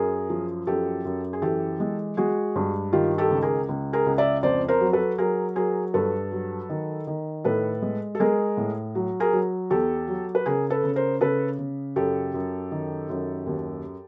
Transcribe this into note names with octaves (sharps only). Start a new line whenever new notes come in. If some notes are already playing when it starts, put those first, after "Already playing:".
Already playing: F#2 G#4 A#4
F3
F#2 G4 A4
F#2
G#4
E3 G4 A4
G#3
G#3 F#4 G#4
G2
D#3 F4 G4
G4 A4
C#2
G#4 A#4
C#2
G#4 A#4
C#2
D5 E5
F2 C5 D5
A#4 C5
F#3
A4 B4
F#3 G#4 A#4
F#3 G#4 A#4
G2 A4 B4
F#3
D#3
D#3
A2 A4 B4
G#3
A4
G#3 G#4 A#4
A2
F#3
G#4 A#4
F#3
E2 G4 A4
F#3
B4
C#3 G#4 A#4
A4 B4
C#3
A#4 C5
C#3 A4 B4
C#3
F#2 G4 A4
F#2
D#3
F#2
D#2